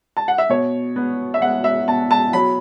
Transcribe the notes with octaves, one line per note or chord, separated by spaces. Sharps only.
A5
F#5
E5
B2 C#5
B3
E5
B3 F#5
E5
B2 A5
A5
F#3 B5